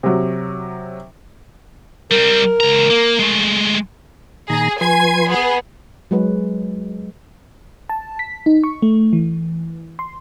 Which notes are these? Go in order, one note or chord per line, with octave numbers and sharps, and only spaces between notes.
C3 F#3
G3 C4 A#4
C#2 A#5
A#3
G#3 A3
A#2 D#3 G#4 A#5
F3 B4 G#5 C6 G#6
B3 G#4
F#3 G#3 B4
A5
B6
D#4
C#6
A3
E3
C6